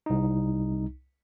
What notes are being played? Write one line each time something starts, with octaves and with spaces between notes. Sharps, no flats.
C2 D#4